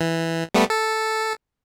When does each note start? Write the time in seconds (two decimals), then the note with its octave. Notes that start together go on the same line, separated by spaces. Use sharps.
0.01 E3
0.54 G3 A3 B3
0.70 A4